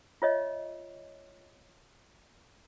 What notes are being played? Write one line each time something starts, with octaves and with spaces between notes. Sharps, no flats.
F4 C#5 D#5 E5